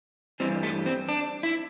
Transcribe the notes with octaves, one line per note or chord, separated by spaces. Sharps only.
G2 E3 G3 C4
A3
C4
D4
E4